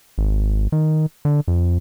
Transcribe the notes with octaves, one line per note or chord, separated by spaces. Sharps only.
G#1
D#3
D3
F2